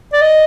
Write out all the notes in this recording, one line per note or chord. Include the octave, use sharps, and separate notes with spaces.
D5
D#5